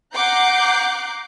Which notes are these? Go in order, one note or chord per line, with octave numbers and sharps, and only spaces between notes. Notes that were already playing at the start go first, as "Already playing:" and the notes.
F#5 A#5 D6 F#6 G6 C7